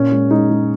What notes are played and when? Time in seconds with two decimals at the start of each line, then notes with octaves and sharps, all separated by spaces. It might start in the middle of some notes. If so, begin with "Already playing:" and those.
Already playing: A#2 C#4
0.12 G#3
0.31 G#3 D#4
0.50 G#3